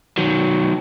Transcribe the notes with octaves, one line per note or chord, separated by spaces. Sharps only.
D#3 F#3